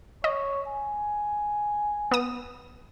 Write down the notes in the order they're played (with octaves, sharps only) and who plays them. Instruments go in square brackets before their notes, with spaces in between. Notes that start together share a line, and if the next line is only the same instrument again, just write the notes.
[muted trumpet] C#5 [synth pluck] D#5
[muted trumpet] G#5
[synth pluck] B3 D#6